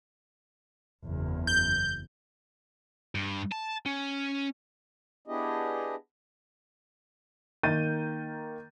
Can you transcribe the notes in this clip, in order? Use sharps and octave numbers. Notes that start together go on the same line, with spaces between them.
F#1 E2
G6
G2
A5
C#4
B3 D4 E4 G4 G#4 D#5
D#3 A#3 G6 A6 D#7